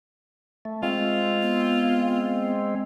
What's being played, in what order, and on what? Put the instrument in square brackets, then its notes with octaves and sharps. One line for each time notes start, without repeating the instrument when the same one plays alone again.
[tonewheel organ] A3
[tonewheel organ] G#3 C4 [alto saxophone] F4
[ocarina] B3